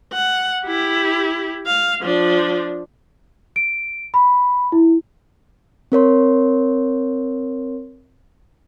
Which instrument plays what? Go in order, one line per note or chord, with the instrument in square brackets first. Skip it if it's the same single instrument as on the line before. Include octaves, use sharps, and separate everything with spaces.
[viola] F#5
E4 G4
F5
F3 D4
[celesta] D7
B5
E4
[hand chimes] C4 A#4 C#5 C6